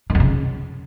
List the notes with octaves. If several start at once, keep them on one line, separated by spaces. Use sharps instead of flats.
D#3
F2
C#3